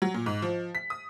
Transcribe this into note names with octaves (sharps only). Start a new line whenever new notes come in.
F#3
A#2
G#2
F3
B6
D#6